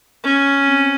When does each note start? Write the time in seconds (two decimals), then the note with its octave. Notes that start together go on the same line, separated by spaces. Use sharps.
0.24 C#4
0.67 C4